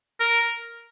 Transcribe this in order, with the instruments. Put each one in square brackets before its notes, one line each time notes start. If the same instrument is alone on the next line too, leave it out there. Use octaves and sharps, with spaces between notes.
[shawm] A#4